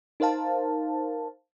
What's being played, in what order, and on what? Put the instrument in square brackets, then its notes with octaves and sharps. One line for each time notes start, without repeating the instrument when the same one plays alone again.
[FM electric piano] D#4 A#4 C5 F5 A5